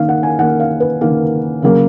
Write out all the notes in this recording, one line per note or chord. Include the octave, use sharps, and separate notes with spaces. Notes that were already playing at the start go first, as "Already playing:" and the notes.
Already playing: D#3 A#3 F5
F#5
G#5
D#3 A#3 F#5
F5
B4
D#3 A#3 A#4
C#3 F#3 A#3